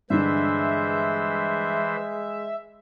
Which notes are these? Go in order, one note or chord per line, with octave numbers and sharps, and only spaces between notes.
G2 D3 E3 G#3 C5 E5